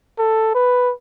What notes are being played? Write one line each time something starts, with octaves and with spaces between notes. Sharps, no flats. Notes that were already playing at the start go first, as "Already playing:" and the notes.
A4
B4